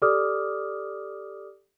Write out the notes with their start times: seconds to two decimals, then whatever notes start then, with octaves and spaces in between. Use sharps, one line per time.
0.02 G4 A4 D5 D6 D#6 F6